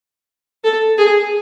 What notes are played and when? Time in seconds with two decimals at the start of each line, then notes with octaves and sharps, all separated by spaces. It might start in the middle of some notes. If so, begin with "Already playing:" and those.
0.64 A4
0.98 G#4